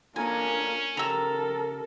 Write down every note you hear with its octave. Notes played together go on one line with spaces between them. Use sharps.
A#3 C#4 D4 F4 A4 A#4 G#5
C#3 G4 A4 A#4 A#5 E6